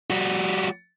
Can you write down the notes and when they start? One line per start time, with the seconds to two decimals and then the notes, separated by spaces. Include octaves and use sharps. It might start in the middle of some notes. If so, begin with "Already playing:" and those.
0.10 G3 F#4